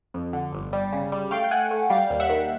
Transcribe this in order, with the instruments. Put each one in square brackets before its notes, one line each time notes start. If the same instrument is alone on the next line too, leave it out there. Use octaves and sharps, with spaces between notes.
[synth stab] F2
D3
G1
G3
C#3
G3
A3 F5 G5
G5
A3 F#5 G#5
A3
G3 F5 G5
D#2
E5 F#5
D#3